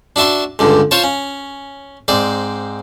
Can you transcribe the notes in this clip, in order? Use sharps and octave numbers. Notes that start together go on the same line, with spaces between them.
D4 F#4 E5 A5 C6
C#2 G2 D3
F4 C5 C#5 A5
C#4
G#2 C4 D5